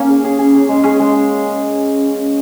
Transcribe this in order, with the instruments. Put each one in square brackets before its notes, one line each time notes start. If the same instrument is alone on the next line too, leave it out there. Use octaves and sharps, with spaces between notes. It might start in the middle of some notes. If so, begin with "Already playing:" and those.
Already playing: [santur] A#3 C#5 [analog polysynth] C#4
[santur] G#4
G#4
G#4
G#4
G#3
[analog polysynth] C#4 [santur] G#4
[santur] G#3